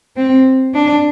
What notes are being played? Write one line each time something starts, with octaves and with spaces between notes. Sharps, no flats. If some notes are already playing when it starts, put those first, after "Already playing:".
C4
D4